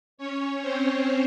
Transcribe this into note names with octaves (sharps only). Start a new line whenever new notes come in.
C#4 C#5
C4 C5